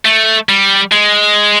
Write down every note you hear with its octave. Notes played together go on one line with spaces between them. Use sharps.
A3
G3
G#3